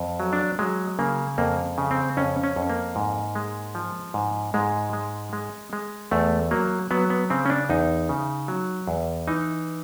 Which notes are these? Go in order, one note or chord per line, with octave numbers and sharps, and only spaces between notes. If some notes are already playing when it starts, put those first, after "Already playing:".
Already playing: F2
F#3
D4
F#3 G#3
C#3 A#3
F2 A#3
C#3
C4
F2 C#4
C#4
F2
A#3
G#2
G#3
F3
G#2
G#2 G#3
G#3
G#3
G#3
E2 A3
F#3 A#3
F#3 B3
B3
C#3 C4
C#4
D4
E2 D#4
C#3
F#3
E2
E3 D#4